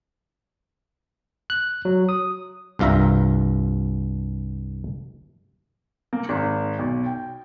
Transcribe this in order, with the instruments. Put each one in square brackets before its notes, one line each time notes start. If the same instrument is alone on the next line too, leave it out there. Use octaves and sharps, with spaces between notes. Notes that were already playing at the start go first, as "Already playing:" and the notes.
[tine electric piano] F#6
F#3
D#6
[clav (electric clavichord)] C2 G2 F4 E5 A#5
[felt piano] A#3
G#1
B1
G5